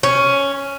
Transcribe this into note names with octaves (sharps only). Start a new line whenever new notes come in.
C#4